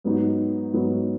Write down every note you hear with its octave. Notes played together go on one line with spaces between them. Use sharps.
G#2 F#3 B3 D#4 F#4
G#2 F#3 B3 D#4 F#4